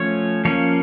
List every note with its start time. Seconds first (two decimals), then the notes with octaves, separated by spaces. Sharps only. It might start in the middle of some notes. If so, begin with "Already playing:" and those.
Already playing: F3 A3 C#4 C#5
0.45 F3 A#3 C#4 C#5